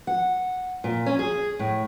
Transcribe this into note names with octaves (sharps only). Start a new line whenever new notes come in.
F#5
A#2
C#4
G#4
A2